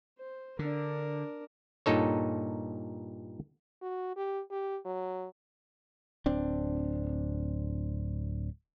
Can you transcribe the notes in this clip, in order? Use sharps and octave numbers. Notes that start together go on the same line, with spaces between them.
C5
D3 D4 A#4
G2 A#2 D#4 A4 C#5
F#4
G4
G4
F#3
D1 C4 D4